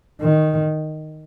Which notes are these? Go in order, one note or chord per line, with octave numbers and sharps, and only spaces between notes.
D#3